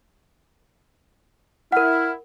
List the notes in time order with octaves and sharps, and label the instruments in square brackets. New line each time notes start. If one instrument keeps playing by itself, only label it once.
[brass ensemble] E4 [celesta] A#4 F#5 [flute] F6